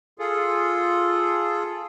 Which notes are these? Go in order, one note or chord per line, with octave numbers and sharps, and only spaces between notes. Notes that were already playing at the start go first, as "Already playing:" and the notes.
F4 G#4 A4